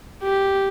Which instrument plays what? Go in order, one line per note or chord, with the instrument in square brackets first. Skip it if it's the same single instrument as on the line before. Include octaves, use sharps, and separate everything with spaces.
[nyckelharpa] G4